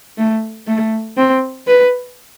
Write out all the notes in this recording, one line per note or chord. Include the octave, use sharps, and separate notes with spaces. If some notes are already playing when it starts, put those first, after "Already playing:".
A3
A3
C4
B4